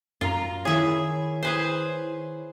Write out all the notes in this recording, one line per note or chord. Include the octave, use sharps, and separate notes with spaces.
F#2 F4 A#5
D#3 E4 G#4 C#5 E5
G#4 B4 C5